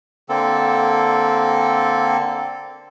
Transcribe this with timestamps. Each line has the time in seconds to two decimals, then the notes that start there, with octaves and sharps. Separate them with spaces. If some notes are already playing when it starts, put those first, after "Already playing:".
0.29 D3 A#3 C4 A4